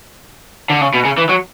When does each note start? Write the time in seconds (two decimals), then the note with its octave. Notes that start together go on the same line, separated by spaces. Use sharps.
0.70 D3
0.81 C#3
0.94 B2
1.05 C#3
1.18 E3
1.29 F#3